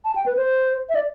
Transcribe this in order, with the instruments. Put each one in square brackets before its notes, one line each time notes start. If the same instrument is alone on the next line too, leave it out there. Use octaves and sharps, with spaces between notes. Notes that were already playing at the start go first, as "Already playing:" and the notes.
[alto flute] A5
G5
B4
C5
E5
D5